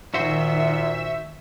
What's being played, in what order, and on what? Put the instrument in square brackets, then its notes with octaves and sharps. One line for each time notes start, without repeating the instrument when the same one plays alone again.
[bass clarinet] A#2 [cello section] D#3 [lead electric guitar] F#4 C5 [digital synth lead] E5